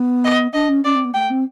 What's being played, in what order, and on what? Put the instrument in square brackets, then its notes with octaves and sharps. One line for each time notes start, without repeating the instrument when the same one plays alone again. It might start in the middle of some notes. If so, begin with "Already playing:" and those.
Already playing: [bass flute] B3
[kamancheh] D#5
[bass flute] D4 [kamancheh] D#5
[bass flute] C#4
[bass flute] C#4 [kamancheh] D5
[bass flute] C4
B3
[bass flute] A3 [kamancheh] G5
[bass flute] C4